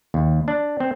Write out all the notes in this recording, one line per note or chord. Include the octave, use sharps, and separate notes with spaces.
D#2
D4
C4